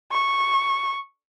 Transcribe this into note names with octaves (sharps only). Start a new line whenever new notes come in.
C#6